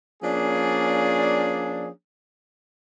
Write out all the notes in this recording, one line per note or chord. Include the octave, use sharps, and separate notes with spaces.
F3 A#3 C#4 D4 G#4 D5